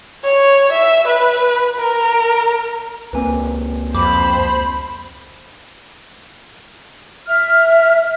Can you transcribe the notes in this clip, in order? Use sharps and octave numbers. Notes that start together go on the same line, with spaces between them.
C#5
E5
B4
A#4
C#2 A#3 C4 B4 G#5
F2 C5 B5 D6
E5 F6